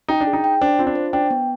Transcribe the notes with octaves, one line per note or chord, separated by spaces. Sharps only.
D#4 G5
D4
G#4
D#4
G5
D4 C5
C4 F4
D4
C5
D4 G5
B3